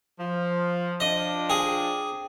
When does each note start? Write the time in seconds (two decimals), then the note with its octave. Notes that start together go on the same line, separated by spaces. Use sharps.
0.19 F3
1.00 F3 D4 D#5
1.50 G#4 G5 D#6